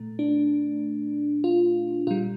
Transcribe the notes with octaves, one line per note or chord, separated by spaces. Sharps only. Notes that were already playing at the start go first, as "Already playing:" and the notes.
Already playing: A#2 A3
D4
F4
A#2 G3 F4